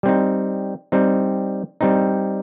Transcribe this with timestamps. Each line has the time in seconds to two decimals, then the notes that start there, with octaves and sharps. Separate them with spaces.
0.03 G3 C4 D#4
0.92 G3 C4 D#4
1.81 G3 C4 D#4